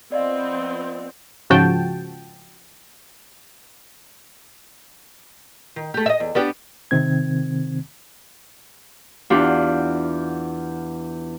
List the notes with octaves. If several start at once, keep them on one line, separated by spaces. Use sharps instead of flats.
F3 B3 C4 D5 D#5 F5
G#2 C#3 F3 F#4 G5 A5
D#3
A3 G4
D#5 E5
E2
B3 D4 G4
C3 D#3 C4 G#6
E2 D4 F4 G4 F#5